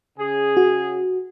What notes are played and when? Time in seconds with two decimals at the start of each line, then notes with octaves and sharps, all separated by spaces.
0.18 C#3 G#4
0.57 F#4